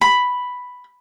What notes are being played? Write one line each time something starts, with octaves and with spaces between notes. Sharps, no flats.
B5